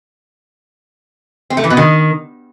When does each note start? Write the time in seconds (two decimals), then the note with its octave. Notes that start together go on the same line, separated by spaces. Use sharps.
1.50 C4
1.57 A3
1.64 E3
1.70 B2
1.77 D#3